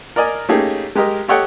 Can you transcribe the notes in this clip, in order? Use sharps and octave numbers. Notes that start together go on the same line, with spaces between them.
A#4 D5 D#5 G#5
A3 A#3 C#4 D#4 G4 G#4
G#3 G4 A#4 D#5
G4 A4 C#5 D#5 F#5 G5